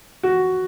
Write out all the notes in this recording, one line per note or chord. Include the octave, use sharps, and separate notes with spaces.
F#4